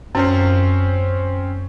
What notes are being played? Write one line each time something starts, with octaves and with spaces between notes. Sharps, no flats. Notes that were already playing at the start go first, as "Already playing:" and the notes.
F#2 C4 C#4 C5